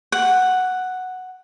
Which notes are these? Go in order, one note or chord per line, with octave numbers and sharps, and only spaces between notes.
F#5